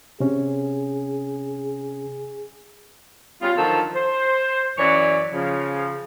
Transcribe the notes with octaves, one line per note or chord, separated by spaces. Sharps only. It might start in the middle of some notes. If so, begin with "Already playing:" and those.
C3 C#4 G#4
G3 B3 C#4 F4
D3 D#3 F3 F#3 F4 A4
C5
F#2 E3 F#4 C#5 D5
C#3 F3